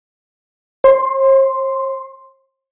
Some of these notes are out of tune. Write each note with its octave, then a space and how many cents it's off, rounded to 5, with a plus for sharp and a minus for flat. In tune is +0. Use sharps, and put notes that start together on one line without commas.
C5 +45 C6 +0